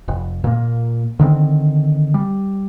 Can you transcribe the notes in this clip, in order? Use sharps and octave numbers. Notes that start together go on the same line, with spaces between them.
F1
A#2 A#3
D3 D#3 A3 C4
G3